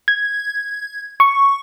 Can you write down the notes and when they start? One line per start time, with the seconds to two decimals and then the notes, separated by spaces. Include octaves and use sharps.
0.08 G#6
1.20 C#6